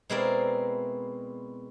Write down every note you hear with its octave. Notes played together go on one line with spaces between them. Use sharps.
B2 G#3 C4 E4 A#4 D5